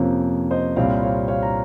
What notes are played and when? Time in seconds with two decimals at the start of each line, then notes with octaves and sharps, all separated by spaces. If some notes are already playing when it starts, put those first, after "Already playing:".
Already playing: F2 C3 F3 A#3 C#4
0.51 C5 D#5
0.76 C2 A#2 G3 C4 C#5 F5
1.02 C#5 F5
1.28 C#5 F5
1.42 A#5